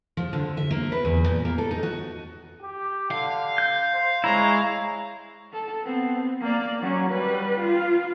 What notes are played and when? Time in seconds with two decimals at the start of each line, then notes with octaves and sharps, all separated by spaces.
0.17 F3
0.33 D3
0.57 E5
0.71 A#3
0.92 B4
1.05 E2
1.26 A#2
1.45 A#3
1.58 A4
1.71 D#4
1.83 F#4
2.62 G4
3.11 D3 F5
3.58 G6
3.94 C5
4.24 G#3 E4 C#5 A#5
5.53 A4
5.83 B3 C4
6.41 A#3 D5
6.81 F#3 C#4
7.11 G3 B4
7.60 F4